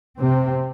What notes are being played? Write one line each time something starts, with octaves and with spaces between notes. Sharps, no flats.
C3 C4